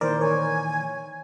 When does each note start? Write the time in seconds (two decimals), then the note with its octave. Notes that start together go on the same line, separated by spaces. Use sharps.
0.01 A#2 D#3 E3 A#4 C5 D5
0.21 C#5 G#5